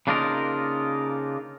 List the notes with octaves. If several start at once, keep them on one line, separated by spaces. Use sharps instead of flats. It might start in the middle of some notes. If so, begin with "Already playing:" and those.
C#3 A#3 D4 D#4 F4 A#4